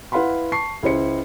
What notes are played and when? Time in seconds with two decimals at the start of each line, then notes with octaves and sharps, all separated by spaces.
0.12 E4 B4 F5 F#5 B5 C6
0.52 A5 C#6 C7
0.83 C#2 E4 C5 C#7